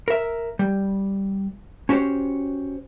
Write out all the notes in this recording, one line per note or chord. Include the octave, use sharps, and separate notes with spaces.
A#4 E5
G3
C#4 F#4 G4 C5 C#5